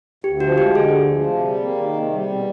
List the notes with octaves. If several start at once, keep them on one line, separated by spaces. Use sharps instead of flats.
D2 G4
F3 F#4
G#3 G4
D3 G#4
D2
F3
C3
G3
A#3
D#3
C3
G3
B2